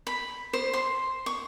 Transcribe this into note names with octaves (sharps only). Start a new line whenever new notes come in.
B5
C5
C6
C#6